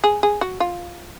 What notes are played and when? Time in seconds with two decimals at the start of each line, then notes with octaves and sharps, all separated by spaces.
0.04 G#4
0.23 G#4
0.41 F#4
0.60 F4